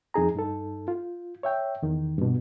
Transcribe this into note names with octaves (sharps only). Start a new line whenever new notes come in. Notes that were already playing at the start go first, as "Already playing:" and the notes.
F2 D#4 G#4 A#5
G2 D#4 A4
F4
C#5 E5 G5
E2 D#3
G2 B2